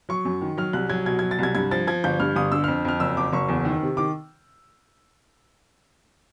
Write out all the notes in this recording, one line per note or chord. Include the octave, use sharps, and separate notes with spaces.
F#3 C#6
F#2
D#3
F#3 F6
C2 F#6
F#3 G#6
B2 G#6
F#3 G#6
A6
C2 G#6
G2 G#6
F3 A6
F3 G#6
G1 G6
G2 F6
G1 D#6
D3 E6
F2 F6
F2 F6
F#1 E6
F#1 D6
F#1 C#6
E2
D#3
C3
D#3 D6